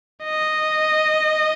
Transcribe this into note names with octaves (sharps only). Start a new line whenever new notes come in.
D#5